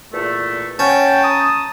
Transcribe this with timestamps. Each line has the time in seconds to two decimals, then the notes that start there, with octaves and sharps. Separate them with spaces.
0.13 E2 A#2 A3
0.79 C#4 C#5 F#5 G5 A5
1.24 A#5 D#6